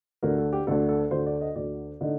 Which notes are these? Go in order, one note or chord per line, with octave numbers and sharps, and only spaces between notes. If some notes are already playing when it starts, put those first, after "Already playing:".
D2 D3 A3 A#4
A4
G4
D2 D3 A3 A4
A4
D2 D3 A3 C5
D5
D#5
D2 D3 A3 D5
D3 A3 D#4